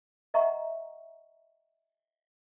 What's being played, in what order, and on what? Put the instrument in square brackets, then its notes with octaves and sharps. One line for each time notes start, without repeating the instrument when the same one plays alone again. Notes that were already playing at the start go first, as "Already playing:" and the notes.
[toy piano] D#5 E5 F#5 A#5 C#6